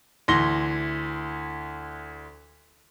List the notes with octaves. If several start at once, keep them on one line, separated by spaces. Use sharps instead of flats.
D2 E3 C6 A#6 G7